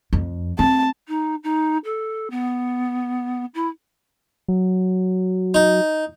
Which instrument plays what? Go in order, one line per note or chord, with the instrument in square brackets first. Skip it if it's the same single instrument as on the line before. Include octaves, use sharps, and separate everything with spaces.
[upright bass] F2
[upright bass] C4 [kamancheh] A5
[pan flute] D#4
D#4
A4
B3
E4
[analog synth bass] F#3
[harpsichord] D#4